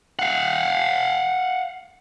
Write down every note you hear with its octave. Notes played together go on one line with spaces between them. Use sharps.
F5 F#5